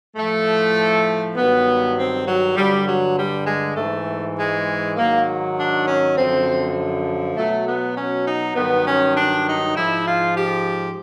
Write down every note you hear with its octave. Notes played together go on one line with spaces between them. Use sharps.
A2 F3 A3
G2 D#3 F#3 B3
C4
F#3
G2 D3 F#3 G3
F#3
G3
G#3
G#2 E3 A3
G#3
G#2 D#3 F#3 A#3
D4
C#4
F#2 D3 F3 C4
B2 F#3 A3
B3
C#4
D#4
G2 D#3 F#3 B3
C#4
D4
D#4
G#2 F3 E4
F4
G4